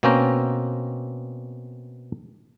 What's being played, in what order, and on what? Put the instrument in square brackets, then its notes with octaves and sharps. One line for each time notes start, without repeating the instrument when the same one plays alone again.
[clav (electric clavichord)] B2 A#3 C4 C#4 G5 A#5